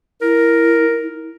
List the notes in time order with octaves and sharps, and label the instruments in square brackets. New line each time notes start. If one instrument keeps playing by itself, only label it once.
[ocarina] E4 [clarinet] A#4